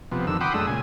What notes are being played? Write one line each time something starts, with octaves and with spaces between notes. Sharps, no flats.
C3 F3 B3
F2 D3 D#3 E6
F#5 G5 B5 C6 D6 D#6
F#2 G#3 A3 D4 D#6 E6
A#2 C#3 G#4 G#5